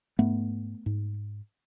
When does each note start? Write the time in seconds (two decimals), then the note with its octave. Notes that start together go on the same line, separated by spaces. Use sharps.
0.19 G#2 A3 B3
0.86 G#2